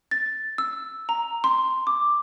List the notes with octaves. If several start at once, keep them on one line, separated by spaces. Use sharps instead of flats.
A6
E6
A#5
C6
D6